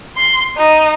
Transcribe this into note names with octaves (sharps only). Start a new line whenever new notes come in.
C6
D#4